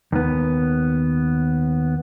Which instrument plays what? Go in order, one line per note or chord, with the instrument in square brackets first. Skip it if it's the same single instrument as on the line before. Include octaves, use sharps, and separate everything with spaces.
[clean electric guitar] D#2 B3